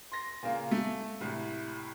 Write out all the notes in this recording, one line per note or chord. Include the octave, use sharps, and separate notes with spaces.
C6 A#6
A#2 C#3 A#3
A3
C2 A2